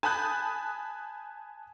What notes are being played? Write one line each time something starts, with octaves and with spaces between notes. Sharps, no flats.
G#5 A5 B5 D#6 F#6 G6